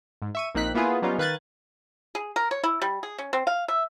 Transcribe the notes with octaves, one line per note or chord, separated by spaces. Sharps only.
G#2
E5 C#6 D#7
A#1 A#3 C4 D#4 F#6 B6
A#3 B3 E4 F4 G#4 B4
F#3 G3 B3 C#4 D#4 F4
D#3 B4 F5 F#6 G#6 A6
G#4
A#4
C#5
E4
G3
G#4
C#4
C4
F5
E5